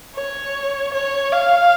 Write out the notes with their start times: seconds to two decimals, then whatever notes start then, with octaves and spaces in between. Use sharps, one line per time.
0.16 C#5
0.93 C#5
1.33 F5